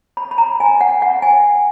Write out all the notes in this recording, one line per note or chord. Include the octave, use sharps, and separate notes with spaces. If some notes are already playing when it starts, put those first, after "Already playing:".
B5
B5
A#5
G#5
F#5
F#5
G#5